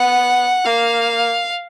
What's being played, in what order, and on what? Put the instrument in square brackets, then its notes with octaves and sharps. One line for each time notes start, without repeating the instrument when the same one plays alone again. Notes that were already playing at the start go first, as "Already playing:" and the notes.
Already playing: [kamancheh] B3 [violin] F#5
[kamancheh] A#3 [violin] F5